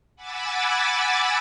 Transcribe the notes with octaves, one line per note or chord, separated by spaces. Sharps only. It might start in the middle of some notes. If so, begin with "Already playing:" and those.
F#5 G#5 B5 D6 E6 A6